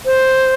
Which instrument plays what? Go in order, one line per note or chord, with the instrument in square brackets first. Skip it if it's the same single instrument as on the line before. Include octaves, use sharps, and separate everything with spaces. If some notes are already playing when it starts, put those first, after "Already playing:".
[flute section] C5